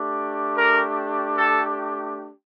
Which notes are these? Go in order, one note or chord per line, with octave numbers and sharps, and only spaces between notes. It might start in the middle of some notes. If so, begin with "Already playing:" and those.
Already playing: A3 D4 G4
A#4
A4